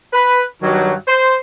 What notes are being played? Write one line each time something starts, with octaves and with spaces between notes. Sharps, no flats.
B4
G2 D#3 F#3
C5